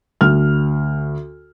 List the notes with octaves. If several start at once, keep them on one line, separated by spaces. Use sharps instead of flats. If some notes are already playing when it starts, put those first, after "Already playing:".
D2 F6